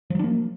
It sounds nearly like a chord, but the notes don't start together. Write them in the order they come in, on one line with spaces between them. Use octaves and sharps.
F3 F#3 D4 A#3